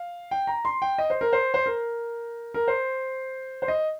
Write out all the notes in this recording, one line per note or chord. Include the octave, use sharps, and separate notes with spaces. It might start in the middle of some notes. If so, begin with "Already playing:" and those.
Already playing: F5
G5
A#5
C6
G5
D#5
C5
A#4
C5
C5
A#4
A#4
C5
C5
D#5